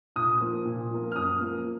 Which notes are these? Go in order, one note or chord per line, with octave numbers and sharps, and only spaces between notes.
A#2 D#6
F3 A#3
A#2
F3 A#3
F6
F#2 D#6
F3 A#3